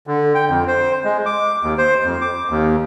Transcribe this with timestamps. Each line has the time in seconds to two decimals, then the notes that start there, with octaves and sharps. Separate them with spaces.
0.07 D3
0.35 G5
0.49 F2
0.68 C5
1.04 G#3
1.26 D6
1.63 D#2
1.78 C5
2.04 F2
2.21 D6
2.50 D#2